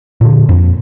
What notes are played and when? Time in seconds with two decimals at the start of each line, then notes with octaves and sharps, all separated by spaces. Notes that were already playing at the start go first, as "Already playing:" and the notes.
0.21 A#2 D3
0.49 F2 A#2